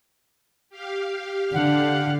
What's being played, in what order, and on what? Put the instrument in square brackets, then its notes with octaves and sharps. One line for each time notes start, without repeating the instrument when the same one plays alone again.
[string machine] G4 F5
[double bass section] D3 [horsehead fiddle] D4 [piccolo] F#5